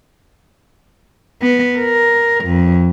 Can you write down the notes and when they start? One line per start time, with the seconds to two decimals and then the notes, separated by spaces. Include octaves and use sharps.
1.42 B3
1.78 A#4
2.45 F2